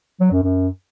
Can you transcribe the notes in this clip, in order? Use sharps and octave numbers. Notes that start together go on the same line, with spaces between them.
F#3
F#2
F#2